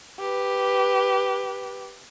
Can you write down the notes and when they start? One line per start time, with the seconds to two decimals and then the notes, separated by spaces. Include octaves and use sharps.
0.19 G4 B4